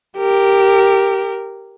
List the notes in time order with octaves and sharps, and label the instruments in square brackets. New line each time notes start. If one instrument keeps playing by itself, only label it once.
[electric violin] G4 A#4